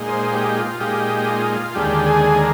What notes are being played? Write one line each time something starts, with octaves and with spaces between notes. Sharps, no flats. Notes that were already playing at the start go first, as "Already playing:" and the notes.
Already playing: A#2 G#3 D#4
C5
G4
F4
A#2 G#3 D#4 G4
F4
D#2 D3 G#3 G4
G#4
A#4